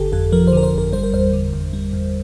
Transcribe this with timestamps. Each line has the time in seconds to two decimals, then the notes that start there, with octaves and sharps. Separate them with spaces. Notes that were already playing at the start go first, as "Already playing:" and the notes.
Already playing: G1 D3 G4 A4
0.12 F2 A4
0.32 F3 A#4
0.47 C5
0.53 D3 A#4
0.63 C5
0.74 G1 A#4
0.92 G3 C5
1.03 A#4
1.13 E2 C5
1.33 D3
1.53 E2
1.73 G3
1.93 E2